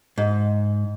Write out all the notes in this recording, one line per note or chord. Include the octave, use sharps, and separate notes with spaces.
G#2